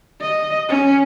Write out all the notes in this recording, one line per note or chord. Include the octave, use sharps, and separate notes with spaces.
D#5
C#4